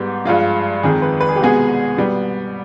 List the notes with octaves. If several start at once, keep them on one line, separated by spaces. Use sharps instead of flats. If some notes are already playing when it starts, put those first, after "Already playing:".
Already playing: G#2 G3 B3 G4
G2 F3 G#3 F4
F2 D#3 G#3 G#4
B4
B4
G#4
G4
C2 B2 G#3 B3 G#4
B2 G3 B3